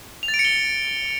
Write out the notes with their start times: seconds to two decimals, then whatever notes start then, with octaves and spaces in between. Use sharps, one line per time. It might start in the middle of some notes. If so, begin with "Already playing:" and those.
0.23 F7
0.28 A6
0.34 D7
0.39 C#7
0.45 G7